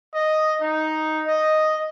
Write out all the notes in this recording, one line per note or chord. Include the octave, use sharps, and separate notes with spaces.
D#5
D#4
D#5